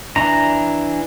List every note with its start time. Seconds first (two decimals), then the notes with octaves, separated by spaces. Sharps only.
0.16 E3 D4 A#5